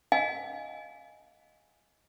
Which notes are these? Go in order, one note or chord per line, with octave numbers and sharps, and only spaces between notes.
D#5 F5 G#5